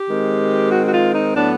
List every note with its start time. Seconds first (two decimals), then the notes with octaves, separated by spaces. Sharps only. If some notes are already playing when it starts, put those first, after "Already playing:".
Already playing: G4
0.08 D#3 G#3 C4
0.71 F#4
0.86 F#4
0.92 F4
1.14 D#4
1.34 A2 F#3 B3 D4